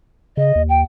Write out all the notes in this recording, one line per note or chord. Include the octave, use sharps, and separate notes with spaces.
C#3 D#5
D#2
G5